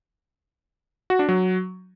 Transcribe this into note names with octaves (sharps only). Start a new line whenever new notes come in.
F#4
D4
F#3